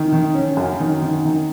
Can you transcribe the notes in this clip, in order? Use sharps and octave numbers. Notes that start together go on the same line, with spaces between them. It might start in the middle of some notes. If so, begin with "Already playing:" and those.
Already playing: D#3
D#3
C#4
F#2
D#3
D#3
D#3